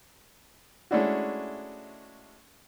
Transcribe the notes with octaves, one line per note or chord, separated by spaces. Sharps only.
G#3 A3 C#4 D4 E4 F#4